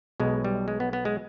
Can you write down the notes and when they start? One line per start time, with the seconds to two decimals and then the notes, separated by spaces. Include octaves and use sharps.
0.20 B1 B2 G#3
0.45 G3
0.68 G#3
0.80 B3
0.93 B3
1.05 G#3